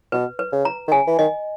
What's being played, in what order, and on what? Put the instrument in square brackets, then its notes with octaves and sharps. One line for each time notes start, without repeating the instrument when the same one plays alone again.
[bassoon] B2 [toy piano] B4
[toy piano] B4
[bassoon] C#3
[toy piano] A#5
[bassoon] D#3
[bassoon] C#3 [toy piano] G#5
[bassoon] E3
[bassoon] D#3 [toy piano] D#5